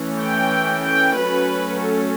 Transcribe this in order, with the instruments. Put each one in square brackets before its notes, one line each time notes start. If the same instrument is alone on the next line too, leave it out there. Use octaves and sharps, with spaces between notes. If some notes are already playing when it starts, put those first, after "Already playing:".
Already playing: [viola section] E3 A3 C#4
G5
G5
F#3 A3 C#4 B4
A4